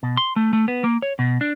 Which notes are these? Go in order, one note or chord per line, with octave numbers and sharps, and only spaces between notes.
B2
C6
A3
A3
B3
A#3
C#5
B2
D4